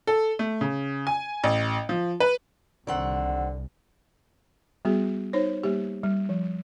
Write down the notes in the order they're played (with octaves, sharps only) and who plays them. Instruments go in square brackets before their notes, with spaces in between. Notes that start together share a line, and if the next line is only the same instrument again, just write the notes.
[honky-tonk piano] A4
A3
C#3
G#5
A1
F3
B4
[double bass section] C2 [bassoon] D3 [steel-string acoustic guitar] D#3 C4 F#5
[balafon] G3 B3 F#4 G#4
D#4 C5 C#5
G3 A#3 G4
G3
F3